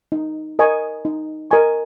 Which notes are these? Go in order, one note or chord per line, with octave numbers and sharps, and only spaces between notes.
D#4
A#4 D#5 G#5 C#6
D#4
A#4 D#5 G#5 C#6